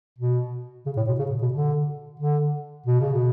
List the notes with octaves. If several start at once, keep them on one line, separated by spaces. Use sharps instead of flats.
B2
C#3
A2
B2
C#3
A2
B2
D3
D3
B2
C#3
B2